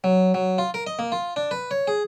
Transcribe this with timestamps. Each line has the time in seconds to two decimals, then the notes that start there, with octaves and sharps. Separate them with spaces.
0.04 F#3
0.34 F#3
0.58 F4
0.74 A#4
0.87 D#5
0.99 A#3
1.12 F4
1.36 D4
1.51 B4
1.71 C#5
1.87 G#4